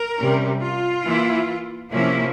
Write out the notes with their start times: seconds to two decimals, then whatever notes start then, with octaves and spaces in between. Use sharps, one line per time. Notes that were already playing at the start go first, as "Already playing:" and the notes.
Already playing: A#4
0.16 C3 G3 C#4
0.61 F4
1.04 E3 A#3 E4
1.92 C3 F3 A#3 C#4 E4